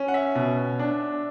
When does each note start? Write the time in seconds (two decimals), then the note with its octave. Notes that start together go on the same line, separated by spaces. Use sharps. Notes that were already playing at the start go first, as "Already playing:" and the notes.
Already playing: C#4
0.08 F#5
0.14 E5
0.35 B2
0.79 D4